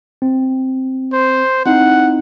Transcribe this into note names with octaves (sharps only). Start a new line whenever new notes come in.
C4
C5
C4 D#4 E4 F#5